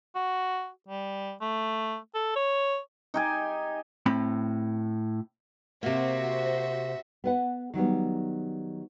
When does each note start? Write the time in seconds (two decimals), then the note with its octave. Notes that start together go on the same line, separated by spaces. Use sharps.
0.15 F#4
0.88 G3
1.41 A3
2.14 A4
2.36 C#5
3.14 D#4 G4 G#5
4.06 A2 C4 B5
5.83 C3 A#3 F#4 C5 E5
7.24 B3 B4 F#5
7.74 D#3 F#3 G3 B3